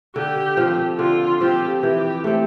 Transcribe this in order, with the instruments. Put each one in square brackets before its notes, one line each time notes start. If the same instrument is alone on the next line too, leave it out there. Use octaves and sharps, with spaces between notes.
[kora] D3 [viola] G4
[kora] F3 C4
[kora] D3 [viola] F4
[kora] F3 C4 [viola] G4
[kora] E3 [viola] G4
[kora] A3 C4